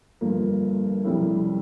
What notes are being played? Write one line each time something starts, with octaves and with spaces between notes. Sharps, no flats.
G1 G2 F3 A#3
F2 C3 G3 C#4 E4